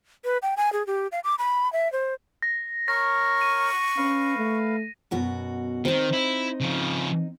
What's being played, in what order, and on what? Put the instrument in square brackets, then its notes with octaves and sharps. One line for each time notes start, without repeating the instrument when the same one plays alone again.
[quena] B4
G5
G#5
G#4
G4
F5
D6
B5
E5
C5
[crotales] A#6
[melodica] A#4 C#5 [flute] C#6 [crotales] A#6
[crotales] D#7
[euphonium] C#4 [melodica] B4 F5
[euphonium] A3
[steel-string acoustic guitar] F#2 B2 F#4
[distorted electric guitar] D#3 [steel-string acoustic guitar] C4 D#4
[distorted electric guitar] E4
C#3 F3